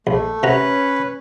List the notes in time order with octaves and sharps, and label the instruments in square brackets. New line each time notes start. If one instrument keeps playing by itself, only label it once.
[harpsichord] A#1 [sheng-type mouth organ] A3
[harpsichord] C3 F#4 A#5 [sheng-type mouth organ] C#4 B4